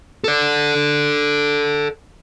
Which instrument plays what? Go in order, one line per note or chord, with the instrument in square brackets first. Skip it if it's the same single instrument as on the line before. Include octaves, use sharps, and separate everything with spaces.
[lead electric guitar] A4 D5